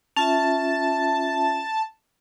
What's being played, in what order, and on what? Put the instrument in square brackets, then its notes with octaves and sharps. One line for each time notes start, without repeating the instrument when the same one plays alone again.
[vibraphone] C#4 F4 E5 [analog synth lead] A5